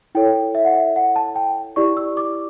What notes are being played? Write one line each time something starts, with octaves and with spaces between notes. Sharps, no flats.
E4 A4 C#5 G5
E5
F#5
E5
F#5
A5
G5
E4 G4 D5 C#6
E6
D6